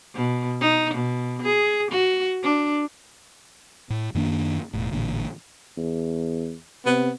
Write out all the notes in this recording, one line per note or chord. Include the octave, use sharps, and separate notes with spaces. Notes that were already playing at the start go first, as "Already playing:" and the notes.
B2
D#4
B2
G#4
F#4
D4
A2
F#2 D#3 A#3 D4
E1 A2
A1 A#2 D3
E2
C3 B3